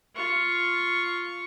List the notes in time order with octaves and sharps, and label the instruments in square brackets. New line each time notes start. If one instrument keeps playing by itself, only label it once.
[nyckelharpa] F4 C#6